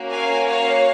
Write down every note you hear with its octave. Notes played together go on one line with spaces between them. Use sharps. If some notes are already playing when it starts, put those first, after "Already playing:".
Already playing: A#3 C#4 F#4
F5 G#5
C#5 F5